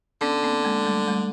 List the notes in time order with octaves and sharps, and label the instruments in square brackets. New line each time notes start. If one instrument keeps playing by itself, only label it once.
[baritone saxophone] D3 [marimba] B3 C#4
[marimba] A#3 C4
G#3 A#3
G3 A3
G3 A3